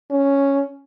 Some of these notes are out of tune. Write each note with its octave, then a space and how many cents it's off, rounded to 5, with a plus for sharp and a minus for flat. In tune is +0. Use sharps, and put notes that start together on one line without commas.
C#4 +0